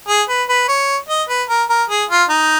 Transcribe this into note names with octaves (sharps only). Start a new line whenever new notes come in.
G#4
B4
B4
C#5
D#5
B4
A#4
A#4
G#4
F4
D#4